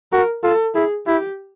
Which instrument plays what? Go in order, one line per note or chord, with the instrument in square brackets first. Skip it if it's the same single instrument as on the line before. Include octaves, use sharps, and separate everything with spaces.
[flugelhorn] F#4 [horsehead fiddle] A#4
[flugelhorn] F4 [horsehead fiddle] A4
[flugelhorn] E4 [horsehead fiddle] G#4
[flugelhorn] E4 [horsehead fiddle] G4